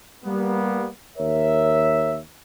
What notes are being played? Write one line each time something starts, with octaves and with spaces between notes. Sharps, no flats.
G3 A#3 B3
D#2 A#4 C#5 E5